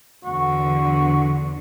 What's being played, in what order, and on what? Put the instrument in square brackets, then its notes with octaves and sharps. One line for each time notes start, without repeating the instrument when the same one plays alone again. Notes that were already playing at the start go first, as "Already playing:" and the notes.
[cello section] E2 D3 [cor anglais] F#4